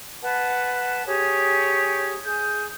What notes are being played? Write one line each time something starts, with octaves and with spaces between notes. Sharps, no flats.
B4 F#5 A5
G4 G#4 C#5
G#4 G6